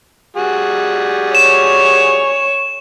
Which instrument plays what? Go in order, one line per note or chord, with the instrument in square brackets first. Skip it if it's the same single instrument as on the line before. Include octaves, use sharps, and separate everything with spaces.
[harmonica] G3 F#4 G#4
[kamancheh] C#5 [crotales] E7